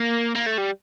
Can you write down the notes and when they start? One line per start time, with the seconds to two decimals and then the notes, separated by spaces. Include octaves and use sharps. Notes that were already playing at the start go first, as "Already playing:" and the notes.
Already playing: A#3
0.36 A#3
0.47 A3
0.58 G3